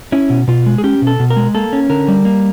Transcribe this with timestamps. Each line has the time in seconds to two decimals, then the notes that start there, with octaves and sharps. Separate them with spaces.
0.12 C#4 E4
0.30 B2
0.47 B2 F4
0.66 G#3
0.78 G#4
0.84 C#4 G4
1.02 B2
1.07 A4
1.20 B2
1.30 A#4
1.37 G#3
1.55 A#3 A4
1.73 C#4
1.90 D3 A#4
2.08 G3
2.25 A#3